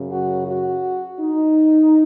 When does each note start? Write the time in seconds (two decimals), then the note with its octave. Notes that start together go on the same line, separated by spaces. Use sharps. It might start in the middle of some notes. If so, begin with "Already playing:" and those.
Already playing: F#2 C#3
0.10 F#4
0.46 F#4
1.20 D#4